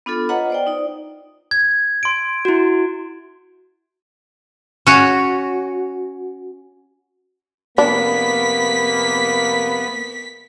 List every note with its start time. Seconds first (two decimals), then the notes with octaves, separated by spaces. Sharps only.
0.06 B3 D4 F4 A4
0.29 F4 B4 C#5 D#5 F#5 A#5
0.50 C5 D5 G5
0.67 D#4 D5
1.51 G#6
2.03 C6 D7
2.45 E4 F#4
4.87 C#4 F#4
7.78 F2 C3 A#3 B3 D4 B6